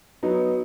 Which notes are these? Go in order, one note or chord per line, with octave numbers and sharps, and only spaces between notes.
F#3 B3 D#4